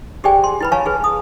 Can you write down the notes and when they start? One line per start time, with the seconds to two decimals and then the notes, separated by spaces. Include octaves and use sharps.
0.24 G4 G#4 C5 D5 G5 G#5
0.44 C6
0.61 E4 B4 B5
0.72 C#5 F5 G#5 A5 C#6
0.86 G#4 B4
1.04 D#6